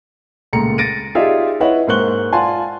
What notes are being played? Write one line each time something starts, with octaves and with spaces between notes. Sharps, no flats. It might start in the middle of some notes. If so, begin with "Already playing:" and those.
C#2 A#2 A3 A#5 C#7
A6 A#6 D7 D#7
D#4 F4 G4 G#4 D5 E5
E4 B4 C#5 D#5 E5 F#5
G#2 A#3 C5 C#6 F#6 G7
F4 D5 F#5 G#5 A5 C6